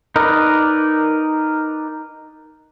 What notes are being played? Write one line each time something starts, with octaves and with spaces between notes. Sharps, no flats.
D#4 A#4 B4 D5 D#5